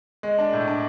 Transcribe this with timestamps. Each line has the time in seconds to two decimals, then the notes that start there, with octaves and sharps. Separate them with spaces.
0.23 G#3
0.38 D4
0.53 A2
0.67 D4